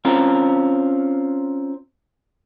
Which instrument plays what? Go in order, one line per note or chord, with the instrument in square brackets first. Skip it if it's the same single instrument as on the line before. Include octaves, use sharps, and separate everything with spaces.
[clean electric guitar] C4 C#4 F4 A#4